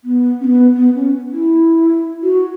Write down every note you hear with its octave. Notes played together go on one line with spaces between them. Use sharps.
B3
C#4
B3
B3
C#4
E4
F#4